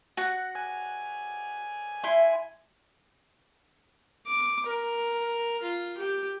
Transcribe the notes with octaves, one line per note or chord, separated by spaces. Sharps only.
F#4 F#5
G#5
E4 E5 C6
D6
A#4
F4
G4